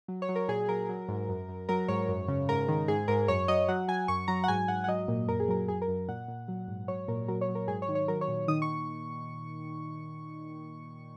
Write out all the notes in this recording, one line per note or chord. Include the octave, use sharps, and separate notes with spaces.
F#3
C#5
F#3
A#4
A#2 G#4
F#3 A#4
F#3
G#2
F#2
F#2
F#3 A#4
G#2 C#5
F#2
C#3
G#2 A#4
D#3
G#2 G#4
G#2 A#4
F#2 C#5
F#3 D#5
F#3 F#5
F#3 G#5
F#2 C#6
F#3 A#5
F#5
G#2 G#5
G#2 F#5
F#5
F#3 D#5
A#2
F#2 A#4
G#4
F#3 A#4
F#2 G#4
A#4
F#2
A#2 F#5
A#2
F#3
G#2
F#3 C#5
A#2 A#4
F#3 A#4
C#5
F#3
A#4
G#2 G#4
C#5
D#3
C#5
F#3 A#4
C#5
A#2
D#3 D#6
C#6